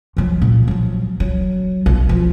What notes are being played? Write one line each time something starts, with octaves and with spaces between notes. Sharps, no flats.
F3 F#3
A#2
F3 F#3
F#3
B1
F3